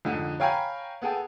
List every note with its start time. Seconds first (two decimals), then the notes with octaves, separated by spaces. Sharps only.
0.05 F2 G#2 D3
0.40 C#5 F5 G5 G#5 A#5 B5
1.02 B3 G#4 A4 G5